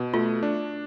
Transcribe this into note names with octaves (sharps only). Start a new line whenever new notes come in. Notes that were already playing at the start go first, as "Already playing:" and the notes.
Already playing: B2
A3 F4
D4